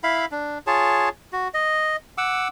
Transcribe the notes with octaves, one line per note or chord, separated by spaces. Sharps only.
E4 E5 F5 B5
D4
F4 G#4 C#5 A5
F#4
D#5
F#5 D6 E6